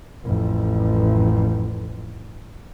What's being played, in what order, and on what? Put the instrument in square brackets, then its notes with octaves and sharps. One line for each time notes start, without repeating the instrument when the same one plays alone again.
[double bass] A1 F2